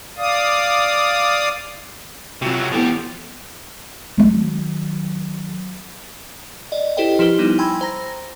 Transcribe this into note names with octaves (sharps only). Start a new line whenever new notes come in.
D5 F5 D#6
C3 F#3 C4 F4 F#4
F3 B3 E4 G4 A4
D#3 F#3
D5 D#5
E4 G4 A4 C5 D#5 G5
F3 E4 G4 B4 F6 G7
G3 B3 D#4 E4
G5 G#5 B5 C6 E6 G#6
C5 A#5 A#6